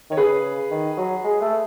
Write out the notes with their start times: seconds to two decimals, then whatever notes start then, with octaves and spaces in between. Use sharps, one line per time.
0.10 D#3 C#5
0.17 C#3 G#4 B4
0.71 D#3
0.97 F#3
1.24 G#3
1.41 A3